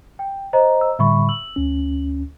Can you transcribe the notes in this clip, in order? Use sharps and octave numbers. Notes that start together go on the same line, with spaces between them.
G5
C5 D#5 A#5
E6
A2 D3 G3 E5 B5 C#6
E6 F#7
D2 C#4